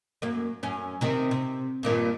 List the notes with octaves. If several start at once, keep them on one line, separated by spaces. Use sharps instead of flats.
F#2 A#3
F#2 C#4
C3 D#3 C4
C3
G2 A#2 D#3